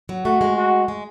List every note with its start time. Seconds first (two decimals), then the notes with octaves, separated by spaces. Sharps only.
0.09 F#3
0.25 A3 F#4
0.41 G#3
0.57 F#4
0.88 G#3